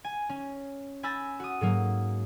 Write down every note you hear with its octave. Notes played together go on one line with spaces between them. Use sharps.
G#5
C#4
G#5 B5 E6 G6 A6 A#6
F#4 D#6
G#2 F#3 A#3